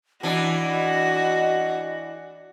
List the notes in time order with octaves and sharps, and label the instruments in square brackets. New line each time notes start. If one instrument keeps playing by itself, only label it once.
[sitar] E3 D4 [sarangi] F#4 [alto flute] D#5